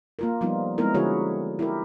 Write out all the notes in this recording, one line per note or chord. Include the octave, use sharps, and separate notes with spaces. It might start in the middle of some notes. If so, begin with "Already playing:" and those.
A#3 F4 A#4
F3 G3 B3 D#4 F4
G#3 B3 C4 D#4 E4 A#4
D3 F3 E4 F#4 G#4 C#5
E4 G4 A#4